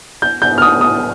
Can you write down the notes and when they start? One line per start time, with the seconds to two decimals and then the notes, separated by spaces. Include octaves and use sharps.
0.22 G6
0.42 G6
0.58 F6
0.62 D#6
0.81 D#6